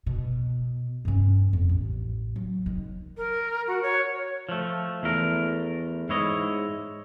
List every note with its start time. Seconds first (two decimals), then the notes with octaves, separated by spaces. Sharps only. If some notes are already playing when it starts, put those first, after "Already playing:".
0.06 B2
1.05 G2 C#4
1.53 F2
1.69 A1
2.36 F#3
2.66 D#3
3.16 A#4
3.67 F#4
3.82 C#5
4.49 F3 A3
5.03 E2 A3 A#4
6.09 G#2 E4 C#5 D#5